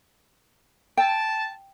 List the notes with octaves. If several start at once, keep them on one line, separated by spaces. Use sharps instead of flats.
G5 A5